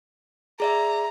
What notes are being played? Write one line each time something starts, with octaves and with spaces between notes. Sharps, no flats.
G#4 D5 E5 A#5